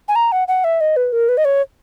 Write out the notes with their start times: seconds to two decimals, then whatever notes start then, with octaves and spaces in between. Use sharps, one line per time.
0.08 G#5
0.15 A#5
0.32 F#5
0.48 F#5
0.64 E5
0.81 D#5
0.96 B4
1.12 A#4
1.29 B4
1.37 D#5
1.45 C#5